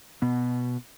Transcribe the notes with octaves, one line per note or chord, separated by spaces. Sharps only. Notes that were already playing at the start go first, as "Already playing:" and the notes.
B2 B3